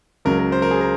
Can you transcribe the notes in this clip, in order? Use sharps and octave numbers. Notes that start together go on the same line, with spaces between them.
C#2 C#3 F#3 A#4
A#4
C5
A#4
G#4
A#4